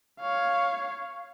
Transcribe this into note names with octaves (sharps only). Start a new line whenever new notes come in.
C#5 F5